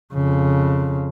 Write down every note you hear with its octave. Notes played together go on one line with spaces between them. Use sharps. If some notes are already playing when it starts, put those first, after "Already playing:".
F2 C#3